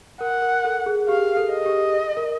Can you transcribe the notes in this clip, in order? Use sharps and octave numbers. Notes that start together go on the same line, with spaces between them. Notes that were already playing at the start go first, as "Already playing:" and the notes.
A#4 F#5
A#4
A4
G#4
G4 F5
A4
D#5
G4
A#4